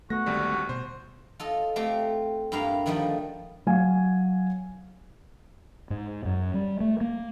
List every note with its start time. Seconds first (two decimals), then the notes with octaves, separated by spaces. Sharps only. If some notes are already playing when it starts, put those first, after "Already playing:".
0.10 A3 B3 F#4 A#6
0.26 G#1 D2 G3
0.69 B2 C5
1.40 F4 A4 D#5
1.76 A3 C4 F4 G4
2.52 G2 E4 F4 G4 A#4 F5
2.86 D3 D#3 F3 G3 A3 D#4
3.67 F#3 F5 G#5
5.90 G#2
6.25 F#2
6.54 G3
6.80 A3
7.01 A#3